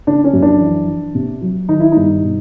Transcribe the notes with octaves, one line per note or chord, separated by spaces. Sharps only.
C#3 D4
C#4
F#2
D4
E3
E3
C3
F#3
D#3 D#4
E4
G2 D#4
B2